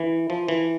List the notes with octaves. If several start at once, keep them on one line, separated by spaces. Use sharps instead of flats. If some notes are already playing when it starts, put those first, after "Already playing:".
Already playing: E3
F3
E3